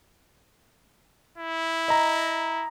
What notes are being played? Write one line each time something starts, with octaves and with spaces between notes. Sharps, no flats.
E4
D#5 A#5